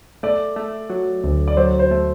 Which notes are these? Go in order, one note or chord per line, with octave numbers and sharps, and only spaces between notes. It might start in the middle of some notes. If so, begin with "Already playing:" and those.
A3 D5
A3
F#3
D2
D5
F#3 C5
C5
A3